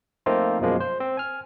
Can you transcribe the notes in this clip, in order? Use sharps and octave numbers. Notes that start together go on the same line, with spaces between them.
F3 A3 A#3 C4 D#4 F4
F#2 B2 F3 G#3 A#3
C5
C4
G#5 F6